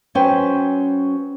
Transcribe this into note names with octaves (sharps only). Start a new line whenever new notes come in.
F#3 C#4 B4 C5 G5